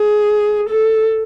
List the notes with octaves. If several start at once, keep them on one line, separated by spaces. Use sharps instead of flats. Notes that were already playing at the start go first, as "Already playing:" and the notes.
Already playing: G#4
A4